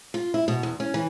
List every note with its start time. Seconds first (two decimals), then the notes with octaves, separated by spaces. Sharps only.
0.14 F4
0.34 E4
0.48 B2
0.63 E2
0.80 C#4
0.94 E3